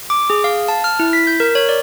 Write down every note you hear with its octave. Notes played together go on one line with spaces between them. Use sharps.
D6
G#4
F5
A5
F6
E4
B6
G6
A#4
C#5
D5